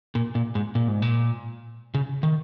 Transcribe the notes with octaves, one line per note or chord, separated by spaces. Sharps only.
A#2
A#2
G#2
A#2
G#2
A#2
C#3
D#3